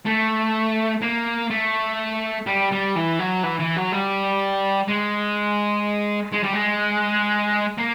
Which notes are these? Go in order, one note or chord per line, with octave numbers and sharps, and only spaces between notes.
A3
A#3
A3
G3
G3
E3
F#3
E3
E3
F#3
G3
G#3
G#3
G3
G#3
A#3